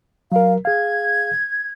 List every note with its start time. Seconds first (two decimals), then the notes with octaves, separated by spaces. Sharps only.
0.32 F#3 A#4 F5
0.65 G#4 F5 G#6